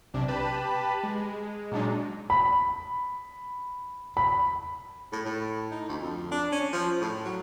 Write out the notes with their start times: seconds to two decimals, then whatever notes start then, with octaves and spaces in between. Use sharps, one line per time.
0.14 B1 C3 D4
0.28 G4 B4 A5 B5
1.03 G#3
1.71 A#2 F#3 G#3 D4 D#4
2.30 B5
4.17 B5
5.13 A2
5.25 A2
5.72 D#4
5.88 D2
6.01 F2
6.31 D4
6.52 C#4
6.73 F3
7.01 A2
7.25 F#3